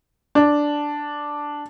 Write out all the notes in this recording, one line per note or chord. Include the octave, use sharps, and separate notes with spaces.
D4